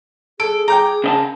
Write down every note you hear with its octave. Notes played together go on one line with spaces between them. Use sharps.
G#4 A4 D7
G5 A#5 D6 G6
C#3 D#5 A5